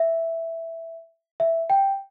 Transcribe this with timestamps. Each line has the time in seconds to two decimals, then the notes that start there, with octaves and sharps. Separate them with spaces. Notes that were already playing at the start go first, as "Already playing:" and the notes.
Already playing: E5
1.40 E5
1.70 G5